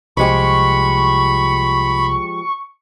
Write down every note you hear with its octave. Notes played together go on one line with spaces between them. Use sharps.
C2 F3 G#3 G4 B5 C#6